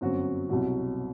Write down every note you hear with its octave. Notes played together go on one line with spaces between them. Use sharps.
G1 F#2 F#3 C4 F#4
C2 B2 F#3